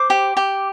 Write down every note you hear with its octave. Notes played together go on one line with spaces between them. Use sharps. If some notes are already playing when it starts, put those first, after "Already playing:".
Already playing: C5 D6
G4
G4